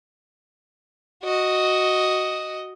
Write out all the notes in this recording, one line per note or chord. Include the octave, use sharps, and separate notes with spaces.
F#4 D#5